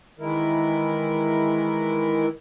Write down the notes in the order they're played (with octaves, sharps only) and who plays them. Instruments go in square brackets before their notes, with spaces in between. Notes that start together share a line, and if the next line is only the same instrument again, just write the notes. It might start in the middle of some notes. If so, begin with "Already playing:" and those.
[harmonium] D#3 E3 G#3 E4 A#4